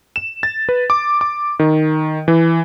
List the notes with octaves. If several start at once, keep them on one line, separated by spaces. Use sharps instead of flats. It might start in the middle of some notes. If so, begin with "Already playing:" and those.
E7
A6
B4
D6
D6
D#3
E3